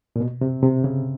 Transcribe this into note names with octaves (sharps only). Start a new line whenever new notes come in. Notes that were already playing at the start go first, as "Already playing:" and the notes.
A#2
B2
C3
C3
C#3